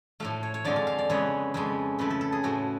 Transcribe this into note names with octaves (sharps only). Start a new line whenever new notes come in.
A2 F3 A3 F5
C#5
C#5
F2 D3 F3 G#3 D5
F5
F5
D5
F2 C#3 G#3 B3 C#5
F2 C#3 F3 G#3
C#3 F3 A3 B4
A4
A4
G#4
A2 F3 A3 F#4